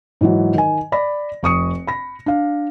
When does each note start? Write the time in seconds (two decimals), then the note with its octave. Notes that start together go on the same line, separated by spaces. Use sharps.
0.21 G#2 E3 F#3
0.54 D#3 G#5
0.92 D5 B5 A#6
1.43 F1 C#6 D#6 C#7
1.87 B5 A#6
2.26 D4 F5